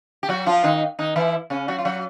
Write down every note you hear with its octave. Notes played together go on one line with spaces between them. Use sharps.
G4
F#3 F#4
F3 F4
D#3 D#4
D#3 D#4
E3 E4
C#3 C#4
F#3 F#4
F4
F#3 F#4